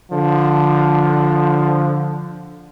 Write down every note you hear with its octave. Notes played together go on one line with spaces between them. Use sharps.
D3 F3